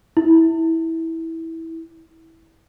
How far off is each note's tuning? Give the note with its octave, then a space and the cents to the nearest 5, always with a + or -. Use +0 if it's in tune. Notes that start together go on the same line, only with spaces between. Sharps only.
E4 -15